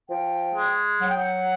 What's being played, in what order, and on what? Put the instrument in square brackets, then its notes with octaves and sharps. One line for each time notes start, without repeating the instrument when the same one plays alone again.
[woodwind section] F3 G5
G#3
F#3 F#5
G5
F#5